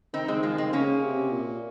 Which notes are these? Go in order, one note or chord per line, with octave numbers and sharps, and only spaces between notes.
D#3 C4 D#4
G#3 C4
F3 G#3
G#3 C4
C#3 A#3 C#4
C3
A#2